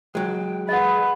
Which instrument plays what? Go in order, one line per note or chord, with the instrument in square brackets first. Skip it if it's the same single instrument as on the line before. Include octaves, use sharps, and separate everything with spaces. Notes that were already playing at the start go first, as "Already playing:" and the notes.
[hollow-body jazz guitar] F#3 G#3 [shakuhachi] G5
[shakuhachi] G#4 [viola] B4 [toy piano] D#5 F#5